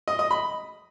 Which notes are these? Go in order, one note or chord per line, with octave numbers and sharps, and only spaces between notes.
D#5
D#5
B5